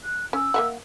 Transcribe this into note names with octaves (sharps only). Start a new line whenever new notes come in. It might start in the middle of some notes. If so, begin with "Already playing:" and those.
F#6
C#4 E6
A#3 E5 F#5